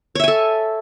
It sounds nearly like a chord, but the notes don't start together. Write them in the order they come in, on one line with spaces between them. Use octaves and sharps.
C#5 E5 G#5 A4